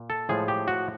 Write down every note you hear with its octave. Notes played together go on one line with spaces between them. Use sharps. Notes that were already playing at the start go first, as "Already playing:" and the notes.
Already playing: A#2
A4
A2 F3 G#3 G#4
G4
F#4